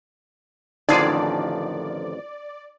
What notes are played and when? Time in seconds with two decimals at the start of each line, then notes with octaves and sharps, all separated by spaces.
0.89 A1 F2 D3 D#3 F3 D#4 G#4 D5